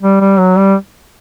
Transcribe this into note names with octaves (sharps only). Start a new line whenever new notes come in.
G3
G3
F#3
G3